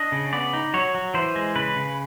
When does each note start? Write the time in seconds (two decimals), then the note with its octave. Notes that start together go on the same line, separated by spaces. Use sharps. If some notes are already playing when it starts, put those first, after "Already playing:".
Already playing: D4 D#5
0.12 C#3
0.33 B3 D5
0.53 D#4
0.74 F#3 C#5
0.95 F#3
1.14 E3 C5
1.36 G#3
1.56 C#3 B4
1.76 C#3